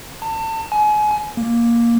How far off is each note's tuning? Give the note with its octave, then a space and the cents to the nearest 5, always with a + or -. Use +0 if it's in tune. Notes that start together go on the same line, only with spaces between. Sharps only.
A5 +30
G#5 +30
A#3 +5